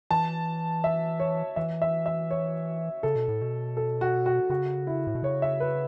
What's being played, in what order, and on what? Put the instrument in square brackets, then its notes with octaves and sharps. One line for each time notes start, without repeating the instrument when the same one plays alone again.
[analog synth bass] E3 [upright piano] A5
[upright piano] E5
C#5
[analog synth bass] E3 [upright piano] E5
[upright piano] E5
E5
C#5
[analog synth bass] C#3 [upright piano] A4
[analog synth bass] B2
A2
B2
[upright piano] A4
F#4
F#4
[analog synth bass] C#3 [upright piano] F#4
[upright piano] E4
[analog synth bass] A2
B2
[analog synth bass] C#3 [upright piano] C#5
[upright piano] E5
B4